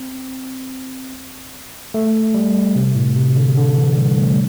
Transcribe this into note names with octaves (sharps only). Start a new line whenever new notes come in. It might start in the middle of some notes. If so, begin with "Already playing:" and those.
Already playing: C4
A3
G3
C3
A2
C3
D3
D3
E3
G3
A3
G3